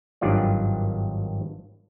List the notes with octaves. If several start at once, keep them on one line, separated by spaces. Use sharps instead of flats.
G#1 G2 D#3 F#3 F4 D5